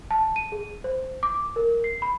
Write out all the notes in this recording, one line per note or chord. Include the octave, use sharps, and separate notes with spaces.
A5
D#7
G#4
C5
D6
A#4
C7
B5